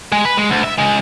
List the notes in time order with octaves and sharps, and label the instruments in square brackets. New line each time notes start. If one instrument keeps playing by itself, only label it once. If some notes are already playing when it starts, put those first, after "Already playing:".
[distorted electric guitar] G#3
B4
G#3
D2
E5
C#3 G#3